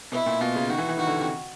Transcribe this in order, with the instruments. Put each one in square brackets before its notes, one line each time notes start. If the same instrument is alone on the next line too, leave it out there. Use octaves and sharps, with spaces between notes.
[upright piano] B2 [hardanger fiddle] E4
[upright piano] A#2
[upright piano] B2 [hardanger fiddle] F4
[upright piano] C#3
[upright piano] D#3 [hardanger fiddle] F#4
[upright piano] E3
E3
[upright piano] D#3 [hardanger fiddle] F#4
[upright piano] D3
C3